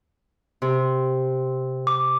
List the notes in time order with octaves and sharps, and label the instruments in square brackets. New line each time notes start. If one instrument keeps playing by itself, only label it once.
[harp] C3
[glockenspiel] D6